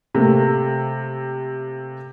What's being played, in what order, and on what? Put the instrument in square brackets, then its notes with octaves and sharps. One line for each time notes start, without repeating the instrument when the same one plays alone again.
[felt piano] C3 A3 A#3